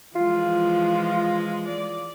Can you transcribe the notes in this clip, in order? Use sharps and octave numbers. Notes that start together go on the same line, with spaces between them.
E3 F3 G#3 F4
D5